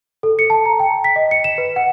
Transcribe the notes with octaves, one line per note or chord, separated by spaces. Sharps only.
A4
C#7
A5
A#5
G5
B6
D#5
C#7
E7
B4
F#5